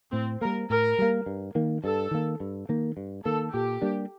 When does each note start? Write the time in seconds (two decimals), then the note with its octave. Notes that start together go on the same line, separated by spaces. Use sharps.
0.12 A2 C4
0.41 G3 A#3 A#4
0.69 A2 A#4
0.98 G3 A#3
1.26 G2
1.55 D#3 A#3
1.83 G2 A4
2.11 D#3 A#3
2.40 G2
2.69 D#3 A#3
2.97 G2
3.25 D#3 A#3 A4
3.54 A#2 G4
3.82 G3 A#3 D4